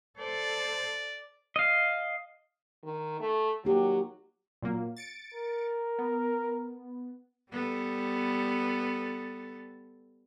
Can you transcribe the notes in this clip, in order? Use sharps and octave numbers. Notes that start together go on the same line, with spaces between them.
A4 C5 D5
D#5 F5
D#3
A3
F#3 A#3 D#4 G4
A#2 F#3 A#3
A6 C#7 D7
A#4
B3
G3 B3 A4